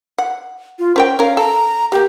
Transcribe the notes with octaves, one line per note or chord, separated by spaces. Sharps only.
F#5
F4
C#4 A#4 C5 G5
C#4 A#4 F5
A4 A#5
G#3 A#3 G4